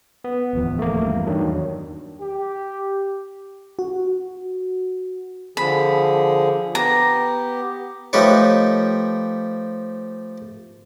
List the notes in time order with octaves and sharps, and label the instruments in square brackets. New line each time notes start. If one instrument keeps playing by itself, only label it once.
[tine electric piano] B3
[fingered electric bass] D1 E2 F3
[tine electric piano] A3 A#3
[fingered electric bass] E2 G2
[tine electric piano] D#3 F#3 D4
[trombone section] G4
[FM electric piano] F#4
[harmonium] D3 F3 G#4 [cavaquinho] B5
[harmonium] B3 G4 [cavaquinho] A#5
[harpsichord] F3 A3 D#4 G4 B4 C#5